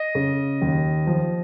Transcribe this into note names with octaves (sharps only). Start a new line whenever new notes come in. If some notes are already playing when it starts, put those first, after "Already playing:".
Already playing: D#5
C#3
D#2
F3